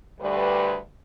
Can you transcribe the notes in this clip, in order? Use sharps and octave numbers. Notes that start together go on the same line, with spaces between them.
D2 G3 B4